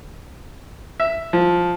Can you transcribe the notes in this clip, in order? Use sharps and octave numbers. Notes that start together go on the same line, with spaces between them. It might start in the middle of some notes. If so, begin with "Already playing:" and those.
E5
F3